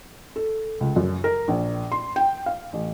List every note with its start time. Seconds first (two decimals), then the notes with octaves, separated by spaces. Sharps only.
0.36 A4
0.81 C#2
0.96 F#2
1.24 A#4
1.48 A#1
1.92 C6
2.16 G5
2.46 F5
2.73 A1